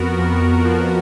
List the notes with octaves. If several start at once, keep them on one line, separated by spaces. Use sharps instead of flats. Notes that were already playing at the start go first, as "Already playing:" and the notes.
Already playing: F2 B3 F#4 A#4
F2
F3